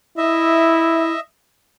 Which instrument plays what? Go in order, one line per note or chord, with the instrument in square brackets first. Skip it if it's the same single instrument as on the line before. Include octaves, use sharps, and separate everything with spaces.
[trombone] E4 [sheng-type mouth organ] D#5 E5